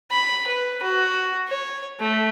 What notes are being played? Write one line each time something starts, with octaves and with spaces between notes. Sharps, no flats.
B5
B4
F#4
C#5
A3